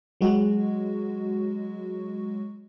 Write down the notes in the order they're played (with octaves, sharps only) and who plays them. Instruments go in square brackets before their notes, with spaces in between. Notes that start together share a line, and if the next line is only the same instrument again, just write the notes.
[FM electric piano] F#3 G#3 F#4